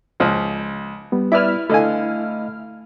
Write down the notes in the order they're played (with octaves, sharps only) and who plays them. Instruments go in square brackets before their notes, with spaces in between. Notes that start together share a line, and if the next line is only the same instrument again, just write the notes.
[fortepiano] C#2 F3
[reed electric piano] G3 B3
[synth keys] E4 F6 [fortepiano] B4 D5 E5
[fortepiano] D3 G#5 [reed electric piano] A3 D#5 F5